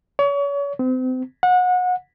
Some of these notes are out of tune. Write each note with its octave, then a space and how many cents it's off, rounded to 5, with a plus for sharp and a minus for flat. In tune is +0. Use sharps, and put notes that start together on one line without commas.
C#5 +35
C4 -35
F#5 -30